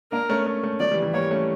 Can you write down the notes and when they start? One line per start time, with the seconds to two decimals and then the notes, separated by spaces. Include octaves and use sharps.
0.12 A#3 D4 A#4
0.29 A3 C#4
0.46 A3 C#4
0.63 A3 C#4
0.80 F3 A3 D5
0.91 E3 G3
1.02 E3 G3
1.14 G3 A#3 C#5
1.31 A3 C#4